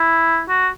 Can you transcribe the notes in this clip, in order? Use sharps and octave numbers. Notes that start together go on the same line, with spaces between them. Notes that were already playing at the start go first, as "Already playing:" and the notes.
Already playing: E4
F#4